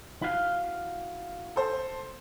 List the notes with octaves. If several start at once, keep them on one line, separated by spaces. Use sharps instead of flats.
E4 F#4 F5
A4 C5